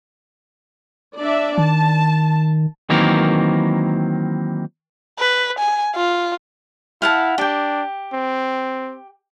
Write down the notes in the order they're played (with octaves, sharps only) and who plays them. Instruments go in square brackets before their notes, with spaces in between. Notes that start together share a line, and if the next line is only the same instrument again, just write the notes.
[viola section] D4 D5 E5
[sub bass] D#3 [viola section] A5
[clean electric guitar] D#3 E3 F#3 A#3 C4 A#4
[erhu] B4
G#5
F4
[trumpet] E4 [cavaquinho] F5 F#5 A5
[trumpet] D4 [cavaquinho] G4 G5
[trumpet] C4